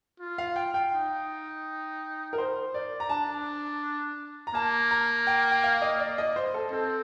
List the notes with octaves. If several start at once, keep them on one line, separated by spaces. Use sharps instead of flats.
F4
F5
G5
G5
D#4
A#4
C5
D5
A#5
D4 A5
A#5
A#3 A5
A#5
G5
G5
F5
D#5
D5
D#5
C5
A4
C4 A4